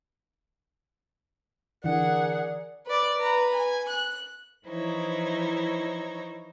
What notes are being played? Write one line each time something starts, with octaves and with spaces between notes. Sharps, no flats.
D3 E3 G#4 A#4 D5 F#5
B4 D5
B4 A#5
G#5
F#6
E3 F3 D#4 E4 C5 C#5